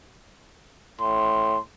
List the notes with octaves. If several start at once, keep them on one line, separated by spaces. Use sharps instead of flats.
A2 C6